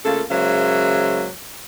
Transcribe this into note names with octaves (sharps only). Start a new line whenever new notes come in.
C#3 A3 A#3 F4 A4
C#3 F#3 G#3 A#3 C5 E5